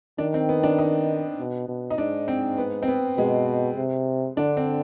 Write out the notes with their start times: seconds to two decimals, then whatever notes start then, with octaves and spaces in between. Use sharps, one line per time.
0.18 D#3 D4
0.34 C4
0.49 B3
0.63 D4
0.78 D#4
1.39 B2
1.68 B2
1.90 D#4
1.98 G#2 D4
2.28 C4
2.58 B3
2.82 C4
2.88 B3
3.17 B2 G#3
3.77 C3
4.37 D3 D4
4.57 C4